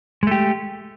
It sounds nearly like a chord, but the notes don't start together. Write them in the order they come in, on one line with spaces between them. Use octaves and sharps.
G#3 A3 G4